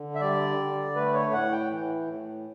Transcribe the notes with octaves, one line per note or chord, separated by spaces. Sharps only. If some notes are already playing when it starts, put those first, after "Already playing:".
Already playing: D3
E5
G3 D5
D3
A3 B4
C#5
A2 F#5
G5
E3
A2